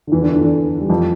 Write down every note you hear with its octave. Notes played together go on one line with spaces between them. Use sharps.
D3
E2 E3
D3
D3
E2 E3
G3
F2 F3